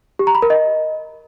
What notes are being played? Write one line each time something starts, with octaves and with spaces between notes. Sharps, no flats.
G4
A#5
B5
A#4
D#5